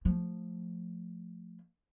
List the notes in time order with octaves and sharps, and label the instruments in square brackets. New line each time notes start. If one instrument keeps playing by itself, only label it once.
[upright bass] F3 A3